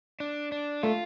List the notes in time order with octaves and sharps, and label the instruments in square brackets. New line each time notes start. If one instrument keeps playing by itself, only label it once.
[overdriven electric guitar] D4
D4
[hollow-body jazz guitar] A3 [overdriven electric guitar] F4